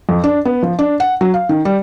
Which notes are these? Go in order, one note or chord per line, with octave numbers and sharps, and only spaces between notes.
F2
D4
B3
F3
D4
F#5
F#3
F5
D#3
G3